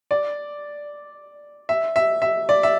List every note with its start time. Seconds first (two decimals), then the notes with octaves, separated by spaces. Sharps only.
0.11 D5
1.69 E5
1.96 E5
2.22 E5
2.49 D5
2.63 E5